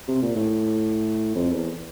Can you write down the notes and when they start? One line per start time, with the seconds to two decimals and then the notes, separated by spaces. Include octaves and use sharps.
0.08 C3
0.22 A#2
0.36 A2
1.36 F2
1.52 E2